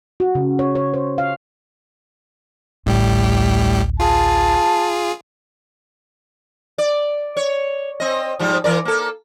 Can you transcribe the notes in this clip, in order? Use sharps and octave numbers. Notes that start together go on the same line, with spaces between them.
F#4
C#3
C#5
C#5
C5
F5
A1 D2 A2 G3 G4
F4 G#4 A5
D5
C#5
C4 D#5
G#2 F3 G3
E3 A#4 D5
A#3 A4